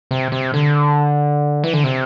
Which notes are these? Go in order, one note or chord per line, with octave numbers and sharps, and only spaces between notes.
C3
C3
D3
E3
D3
C3